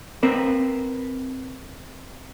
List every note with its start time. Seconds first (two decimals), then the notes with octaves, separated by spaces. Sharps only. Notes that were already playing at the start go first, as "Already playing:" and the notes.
0.23 C4 A#4 B4